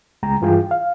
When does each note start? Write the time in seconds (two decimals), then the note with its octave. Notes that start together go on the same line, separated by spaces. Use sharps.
0.23 C#2 G#3 G5 A#5
0.41 G2 E3 F4 G#4 G5
0.71 F5